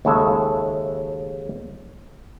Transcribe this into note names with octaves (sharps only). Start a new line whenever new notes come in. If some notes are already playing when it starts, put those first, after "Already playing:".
D#2 C#3 G#3 A4 E5